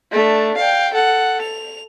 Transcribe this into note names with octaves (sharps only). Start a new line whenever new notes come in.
A3 D4
F5 G5
A4 F#5
F7